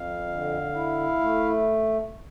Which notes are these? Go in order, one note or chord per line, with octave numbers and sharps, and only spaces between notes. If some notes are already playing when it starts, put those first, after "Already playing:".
Already playing: F2 F5
D3
E4
A3